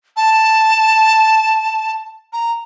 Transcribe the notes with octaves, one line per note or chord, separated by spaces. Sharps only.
A5
A#5